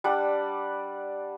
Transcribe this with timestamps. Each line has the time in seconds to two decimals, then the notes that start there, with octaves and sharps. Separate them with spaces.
0.04 G3 D4 D5 F#5